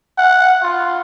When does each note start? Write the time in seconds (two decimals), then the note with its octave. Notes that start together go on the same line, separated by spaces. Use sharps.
0.18 F#5
0.63 F4